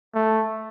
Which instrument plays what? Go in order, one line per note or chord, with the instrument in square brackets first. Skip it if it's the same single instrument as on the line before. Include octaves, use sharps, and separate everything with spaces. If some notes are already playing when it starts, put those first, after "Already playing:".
[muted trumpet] A3